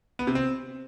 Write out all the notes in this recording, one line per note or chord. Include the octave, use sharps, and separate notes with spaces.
B3
C3
C4